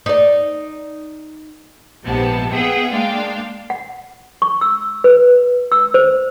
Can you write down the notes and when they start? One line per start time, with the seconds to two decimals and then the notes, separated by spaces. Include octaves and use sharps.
0.06 D#4 D5
2.03 A#1 G#2 C3 B3 A5
2.51 B3 G#4 E5 F#5 G5
2.90 G#3 A#3 D4 F5 G5
3.70 F#5
4.42 C#6
4.61 E6
5.04 B4
5.72 E6
5.94 C5